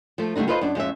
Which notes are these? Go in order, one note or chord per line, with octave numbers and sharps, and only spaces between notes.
F3 A3
D3 G3 A3 D4 D#4
F4 A4 B4 C5 D#5
F#2 D4
F2 G#3 C#4 E5